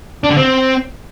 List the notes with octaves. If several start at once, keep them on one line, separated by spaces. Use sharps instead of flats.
D4
D3
C4